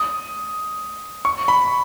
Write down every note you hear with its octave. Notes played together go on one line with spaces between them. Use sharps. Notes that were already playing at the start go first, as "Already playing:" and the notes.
Already playing: D#6
C#6
B5